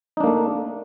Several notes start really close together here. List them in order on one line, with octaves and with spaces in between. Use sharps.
D#4 D4 A#3 A3